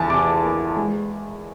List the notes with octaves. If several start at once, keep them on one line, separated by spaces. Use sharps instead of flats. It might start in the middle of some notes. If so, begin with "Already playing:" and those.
Already playing: E2 G#5 A5
C3 D6
A#3
G#3